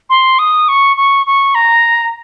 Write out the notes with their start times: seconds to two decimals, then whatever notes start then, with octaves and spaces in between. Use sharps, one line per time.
0.10 C6
0.39 D#6
0.68 C#6
0.97 C#6
1.27 C#6
1.55 A#5